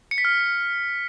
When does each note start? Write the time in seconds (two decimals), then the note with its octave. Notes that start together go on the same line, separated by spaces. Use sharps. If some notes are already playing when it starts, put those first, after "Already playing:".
0.11 C#7
0.18 B6
0.25 F6